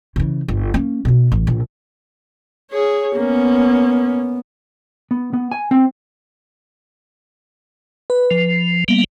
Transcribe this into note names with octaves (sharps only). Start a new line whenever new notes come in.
C#3 E3
G1
A#3 C#4
B2 D#3
A1
A#1
G#4 C#5
A#3 B3 C#4
B3
B3
G#5
C4
B4
F3
G3 A#3 B3